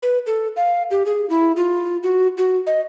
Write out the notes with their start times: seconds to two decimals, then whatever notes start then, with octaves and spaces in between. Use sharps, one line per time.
0.03 B4
0.26 A4
0.57 F5
0.91 G4
1.06 G#4
1.30 E4
1.56 F4
2.03 F#4
2.38 F#4
2.67 D#5